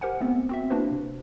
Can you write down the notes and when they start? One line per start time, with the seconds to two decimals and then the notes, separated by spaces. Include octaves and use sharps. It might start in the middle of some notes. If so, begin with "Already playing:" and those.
0.01 G4 A#4 C5 F#5 G#5
0.21 A3 B3 C4
0.49 C4 F#4 E5
0.70 A#3 D4 E4 F#4 B4 C5
0.91 C3